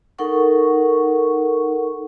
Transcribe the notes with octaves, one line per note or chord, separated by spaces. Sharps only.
D#4 A4 A#4 F#5 C#6